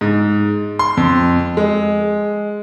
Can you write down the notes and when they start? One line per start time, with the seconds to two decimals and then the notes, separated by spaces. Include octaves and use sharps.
0.01 G#2
0.79 C6
0.97 F2
1.57 G#3